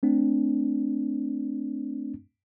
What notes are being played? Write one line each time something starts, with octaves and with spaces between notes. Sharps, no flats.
A3 C4 D4